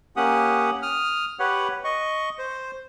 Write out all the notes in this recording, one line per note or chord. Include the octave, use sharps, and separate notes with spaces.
A#3 C#4 G4 F#5 D#6
D#6 F6
G4 B4 C#5 F#5
D#5 C#6
C5